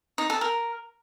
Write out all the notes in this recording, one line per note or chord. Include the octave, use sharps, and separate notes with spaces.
D#4
A4
A#4